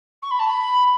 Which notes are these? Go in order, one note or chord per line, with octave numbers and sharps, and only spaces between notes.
C#6
B5
A5
B5